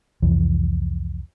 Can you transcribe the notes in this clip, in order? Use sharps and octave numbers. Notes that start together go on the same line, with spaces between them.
C2 F2 E3